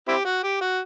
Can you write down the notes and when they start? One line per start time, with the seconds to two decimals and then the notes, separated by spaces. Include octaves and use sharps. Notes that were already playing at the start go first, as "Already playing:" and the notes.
0.08 C4 E4 G4
0.25 F#4
0.43 G4
0.61 F#4